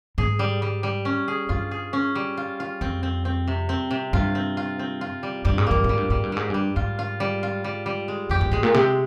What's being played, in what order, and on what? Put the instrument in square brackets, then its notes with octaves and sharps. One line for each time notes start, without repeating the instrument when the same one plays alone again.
[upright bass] G#2 [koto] G#4
[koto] G3
G3
G3
C#4
G#4
[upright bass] G2 [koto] F4
[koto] G#4
C#4
G3
F4
F4
[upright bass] F2 [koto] C4
[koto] C4
C4
C3
C4
C3
[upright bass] G2 [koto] F4
[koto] C4
F4
C4
F4
G3
[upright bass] G2 [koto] G3
[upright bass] G#2
[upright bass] G2 [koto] A#3
[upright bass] G#2
[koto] G3
[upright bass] G2
[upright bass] G#2 [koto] G3
[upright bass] G2
[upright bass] G#2 [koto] G3
[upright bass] G2 [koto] G3
[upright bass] G#2 [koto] F4
[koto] F4
G3
F4
G3
G3
G#3
[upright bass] F2 [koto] G4
[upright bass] G2
[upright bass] G#2 [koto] G#3
[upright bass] A#2
[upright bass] C3 [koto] G#3